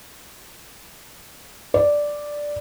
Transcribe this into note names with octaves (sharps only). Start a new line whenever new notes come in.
D5